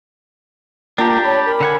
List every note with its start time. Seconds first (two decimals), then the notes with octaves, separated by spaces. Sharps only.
0.98 A#3 D4 F4 G4 G5 A5 A#5
1.25 C#5 B5
1.46 A#4 G5
1.61 D3 F#5 G#5